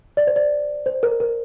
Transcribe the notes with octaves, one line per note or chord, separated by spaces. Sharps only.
D5
C5
D5
C5
A#4
A#4